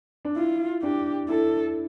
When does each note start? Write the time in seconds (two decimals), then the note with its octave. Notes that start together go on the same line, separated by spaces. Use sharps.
0.25 D4
0.36 E4 F4
0.82 D4 G4
1.28 E4 A4